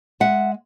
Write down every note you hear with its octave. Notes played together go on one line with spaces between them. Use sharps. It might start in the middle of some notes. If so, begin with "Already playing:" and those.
G#3 E5 F#5